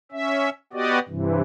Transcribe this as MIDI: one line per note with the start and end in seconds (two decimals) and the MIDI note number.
0.12 0.50 61
0.12 0.50 76
0.73 0.99 59
0.73 0.99 66
0.73 0.99 67
0.73 0.99 74
0.73 0.99 75
1.08 1.42 43
1.08 1.42 48
1.08 1.42 52